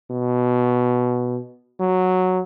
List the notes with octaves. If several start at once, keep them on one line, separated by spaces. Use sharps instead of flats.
B2
F#3